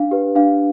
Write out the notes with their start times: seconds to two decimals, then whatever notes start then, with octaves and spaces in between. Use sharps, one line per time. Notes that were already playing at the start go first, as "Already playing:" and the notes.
Already playing: D4 F5
0.11 G4 B4
0.35 D4 F5